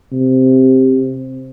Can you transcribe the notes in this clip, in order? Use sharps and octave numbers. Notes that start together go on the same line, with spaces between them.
C3